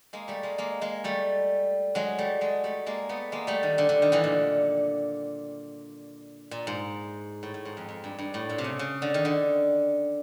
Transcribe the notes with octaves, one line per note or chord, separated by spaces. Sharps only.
G#3 A#3
G3 A3
G#3 A#3
G#3 A#3
G#3 A#3
G3 A3
F#3 G#3
G3 A3
F#3 G#3
G3 A3
G#3 A#3
A3 B3
G#3 A#3
G3 A3
D#3
D3
D3
D#3
D3 E3
A#2
A#2
G#2
A2
A2
G#2
F2
F2
G2
G2
A2
A#2
C3
C#3
C#3
D3
D#3
D3